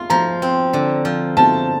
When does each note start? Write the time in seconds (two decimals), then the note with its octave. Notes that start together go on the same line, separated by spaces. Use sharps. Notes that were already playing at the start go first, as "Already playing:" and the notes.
Already playing: F4 C6
0.10 F3 A#5
0.42 C4
0.73 D3
1.05 F3
1.37 F3 A5